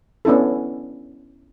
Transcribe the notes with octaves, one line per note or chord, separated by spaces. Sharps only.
B3 C#4 D4 E4 A4